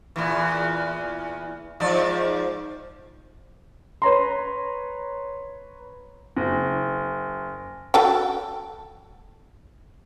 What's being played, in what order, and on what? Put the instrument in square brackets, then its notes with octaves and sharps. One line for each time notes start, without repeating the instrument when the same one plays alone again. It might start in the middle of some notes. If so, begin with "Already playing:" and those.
[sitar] E2 A#2 E3
G#2 F3 D5
[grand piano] B4 C#5 A#5 C6
[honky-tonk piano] F#1
[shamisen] F#4 A4 G5